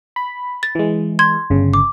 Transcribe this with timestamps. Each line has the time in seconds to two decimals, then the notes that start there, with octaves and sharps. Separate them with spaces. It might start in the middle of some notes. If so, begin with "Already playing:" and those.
0.16 B5
0.63 A6
0.75 E3 G#3
1.19 C6 G#6
1.50 G1 C#3
1.74 D6